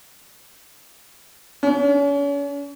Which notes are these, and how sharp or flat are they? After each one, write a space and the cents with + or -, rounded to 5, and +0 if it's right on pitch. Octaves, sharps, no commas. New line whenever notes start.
C#4 +40